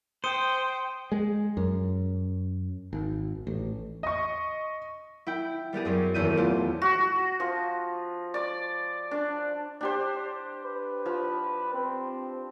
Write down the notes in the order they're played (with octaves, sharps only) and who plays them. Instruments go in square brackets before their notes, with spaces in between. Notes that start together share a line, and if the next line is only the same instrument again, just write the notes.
[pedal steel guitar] C5 [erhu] G5 [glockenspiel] D#6 C#7 D#7
[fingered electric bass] G#3
F#2
G#1
A1
[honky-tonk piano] D#5 C#6
[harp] E4 G5
G3 B3 G4 G#4
F#2 C4 C#4
D#1 E2 E4 G6 D#7
A3 B3 C4 F4 G4
[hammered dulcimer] F#4
F3
D5
D4
[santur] D4 G4 C5
[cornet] B4
[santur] F3
[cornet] C4